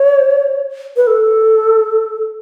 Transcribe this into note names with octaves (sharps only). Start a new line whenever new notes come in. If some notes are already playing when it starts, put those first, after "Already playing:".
Already playing: C#5
B4
A4